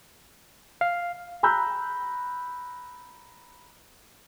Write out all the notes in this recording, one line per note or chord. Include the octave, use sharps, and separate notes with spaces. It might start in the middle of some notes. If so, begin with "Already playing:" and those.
F5
A#5 B5 E6 F#6 G6